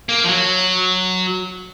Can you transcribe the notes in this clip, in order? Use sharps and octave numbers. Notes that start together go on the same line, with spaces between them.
A#3
F3
F#3